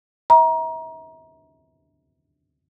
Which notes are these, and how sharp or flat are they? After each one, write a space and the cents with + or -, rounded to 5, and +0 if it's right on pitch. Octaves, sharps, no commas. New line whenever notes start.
E5 -40 A#5 +25